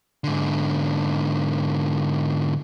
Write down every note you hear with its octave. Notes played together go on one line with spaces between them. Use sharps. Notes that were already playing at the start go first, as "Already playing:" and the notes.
G#2 D3